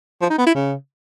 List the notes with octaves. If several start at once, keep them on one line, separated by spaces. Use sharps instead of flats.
F3
D#4
B3
E4
C#3